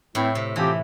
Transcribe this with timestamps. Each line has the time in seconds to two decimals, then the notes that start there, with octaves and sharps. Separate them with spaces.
0.15 A2 E3 A3 C4 E4
0.35 C3
0.56 E3 F3 C4 G4